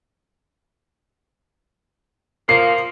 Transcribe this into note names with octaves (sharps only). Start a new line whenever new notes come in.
F3 A#3 C7